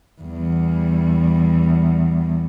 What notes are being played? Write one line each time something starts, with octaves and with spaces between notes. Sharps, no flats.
E2 G3